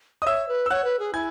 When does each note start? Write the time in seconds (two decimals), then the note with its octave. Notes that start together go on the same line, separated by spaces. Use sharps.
0.22 D#5 D#6
0.26 C#5 E5 E6
0.48 B4
0.66 E6
0.70 C#5 F#5 F#6
0.84 B4
0.99 G#4
1.13 E4 G#5 G#6